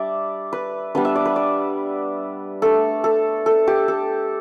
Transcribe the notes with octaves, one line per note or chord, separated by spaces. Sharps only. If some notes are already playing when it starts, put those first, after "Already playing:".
Already playing: G3 D4 D5 E5
B4
G3 B3 D4 B4
E5
D5
B4
D5
A3 D4 A4
A4
A4
G4
A4